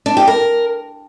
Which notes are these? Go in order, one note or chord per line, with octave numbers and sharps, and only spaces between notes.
D4
G4
A#4